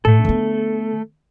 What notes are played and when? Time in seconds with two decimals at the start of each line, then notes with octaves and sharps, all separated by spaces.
0.05 A2 A3 A4
0.25 D3 B3